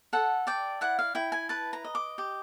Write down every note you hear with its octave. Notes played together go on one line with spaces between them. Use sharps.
A4 F#5
D5 G5
E4 F#5
F5
E4 G5
G#5
B4 A5
A#5
D#5
D6
G4